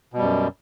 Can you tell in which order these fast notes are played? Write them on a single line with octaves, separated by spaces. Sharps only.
B2 G3 F#2